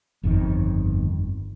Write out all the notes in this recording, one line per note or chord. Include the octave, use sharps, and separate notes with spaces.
G1 F2 C3 D#3